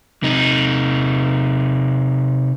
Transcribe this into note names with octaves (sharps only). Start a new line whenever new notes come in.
C3 D#4